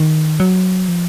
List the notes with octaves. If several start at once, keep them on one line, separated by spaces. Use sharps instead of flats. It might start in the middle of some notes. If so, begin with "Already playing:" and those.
Already playing: D#3
F#3
F3